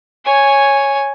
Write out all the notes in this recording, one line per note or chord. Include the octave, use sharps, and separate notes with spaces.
C#5 G#5